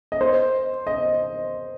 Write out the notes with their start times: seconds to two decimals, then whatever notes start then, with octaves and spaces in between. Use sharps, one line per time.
0.12 D#5
0.21 C5
0.87 D#5